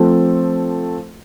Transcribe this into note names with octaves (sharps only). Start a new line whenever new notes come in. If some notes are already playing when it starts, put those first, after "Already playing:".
Already playing: F3 A3 C4 F4 A4